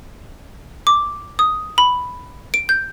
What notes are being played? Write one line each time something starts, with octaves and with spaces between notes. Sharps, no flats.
D6
D#6
B5
D7
G6